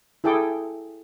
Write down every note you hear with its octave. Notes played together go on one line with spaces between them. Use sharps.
E4 G#4 A4 G5 D6